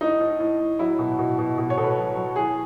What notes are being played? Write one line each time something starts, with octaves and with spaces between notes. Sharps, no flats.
A2 D#4
A2
A2
A2
F#3 E4
B2
B2
B2
B2
C#5
B2 A4
B4
F#3
F#3
A2 G#4